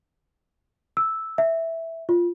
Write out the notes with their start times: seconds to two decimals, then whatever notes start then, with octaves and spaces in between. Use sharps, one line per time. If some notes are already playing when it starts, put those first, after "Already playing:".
0.97 E6
1.38 E5
2.09 F4